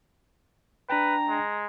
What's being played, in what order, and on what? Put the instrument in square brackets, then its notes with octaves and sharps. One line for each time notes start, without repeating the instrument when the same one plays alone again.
[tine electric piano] D4 G5 [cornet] B4 [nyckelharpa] A#5
[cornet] G#3